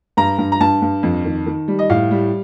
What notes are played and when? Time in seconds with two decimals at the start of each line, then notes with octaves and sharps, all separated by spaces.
0.17 G2 A#5
0.38 G2
0.52 A#5
0.60 G2 A5
0.82 G2
1.03 F2
1.25 D#3
1.46 D#3
1.68 G3
1.79 D#5
1.90 A2 F5
2.11 G3